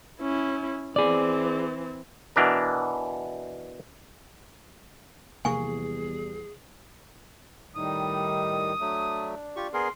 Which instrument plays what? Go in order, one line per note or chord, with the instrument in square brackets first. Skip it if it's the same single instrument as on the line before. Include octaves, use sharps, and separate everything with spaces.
[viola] C#4 E4
[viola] E3 C4 [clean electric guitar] G#4 D5
[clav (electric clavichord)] B2 E3 D4 A#4
[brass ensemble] E2 G3 [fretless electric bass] C3 F3 A#3 [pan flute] G#4 [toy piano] G#5 C#6
[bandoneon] A2 [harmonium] D#3 G3 D#4 [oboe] D#6
[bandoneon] F#3 A3 [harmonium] D4
[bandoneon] F4 G4 C#6
[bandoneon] B3 G#4 A#4 [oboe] C6